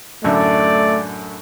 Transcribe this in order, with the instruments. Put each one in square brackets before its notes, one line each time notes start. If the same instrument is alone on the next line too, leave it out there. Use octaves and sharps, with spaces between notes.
[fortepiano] F#2 A2 D3 [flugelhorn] A3 [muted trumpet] D5